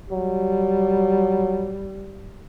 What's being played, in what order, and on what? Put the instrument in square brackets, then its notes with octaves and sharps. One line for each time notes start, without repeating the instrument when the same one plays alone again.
[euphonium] F#3 [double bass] G3